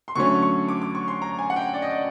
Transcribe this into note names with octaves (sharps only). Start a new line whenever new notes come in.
C6
D3 F#3 A3 C#4 C#6
C#6
D6
D6
C#6
C6
A#5
G#5
F#5
G5
D5
D#5
D5